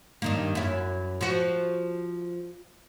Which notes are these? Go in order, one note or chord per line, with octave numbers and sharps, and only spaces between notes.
G2 D#3 A#3
F#2 E4
F3 F#4